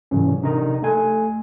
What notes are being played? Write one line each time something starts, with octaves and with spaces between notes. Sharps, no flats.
G#2 C3 E3 F#3 C#4
C3 D4 D#4 A#4 D#5 A#5
A3 A4 G#5